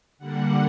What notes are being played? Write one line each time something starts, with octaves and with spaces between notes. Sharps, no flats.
D3 G3 A#3 D4 F#5